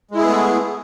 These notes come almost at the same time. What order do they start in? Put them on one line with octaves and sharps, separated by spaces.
G#3 E4 G#4 B3 A3